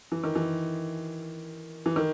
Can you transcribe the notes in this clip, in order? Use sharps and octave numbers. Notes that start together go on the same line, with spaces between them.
E3
D#3
E3
E3
D#3